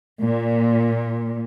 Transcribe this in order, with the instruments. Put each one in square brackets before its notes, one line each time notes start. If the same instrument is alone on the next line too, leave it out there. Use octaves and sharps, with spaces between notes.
[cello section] A#2